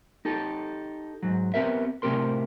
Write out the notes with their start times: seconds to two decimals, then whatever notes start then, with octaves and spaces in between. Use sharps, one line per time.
0.25 D#4 G4 A4
1.23 G#2 F#3
1.54 B3 C4 G4 A#4 E5
2.02 A2 C3 C4 G4 A#4 C6